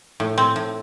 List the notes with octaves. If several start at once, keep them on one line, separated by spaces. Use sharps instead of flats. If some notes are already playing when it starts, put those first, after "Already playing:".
A2
C4
A2